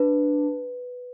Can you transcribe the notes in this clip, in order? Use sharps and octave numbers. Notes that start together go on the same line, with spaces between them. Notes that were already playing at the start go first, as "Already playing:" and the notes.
Already playing: D4 B4